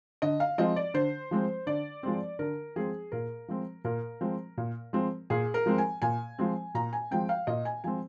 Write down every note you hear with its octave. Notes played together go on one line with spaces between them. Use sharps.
D3 D#5
F5
F3 G#3 C4 D#5
D5
D3 C5
F3 G#3 C4
D3 D5
F3 G#3 C4
D3 A#4
F3 G#3 C4 G#4
A#2 A#4
F3 G#3 C4
A#2 A#4
F3 G#3 C4
A#2
F3 G#3 C4
A#2 G#4
A#4
F3 G#3 C4
G#5
A#2 G#5
F3 G#3 C4
A#2 A#5
G#5
F3 G#3 C4 G5
F5
A#2 D#5
G#5
F3 G#3 C4 G#5